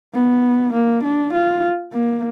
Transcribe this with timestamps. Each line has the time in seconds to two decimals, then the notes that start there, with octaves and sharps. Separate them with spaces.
0.14 B3
0.73 A#3
1.04 D4
1.33 F4
1.93 A#3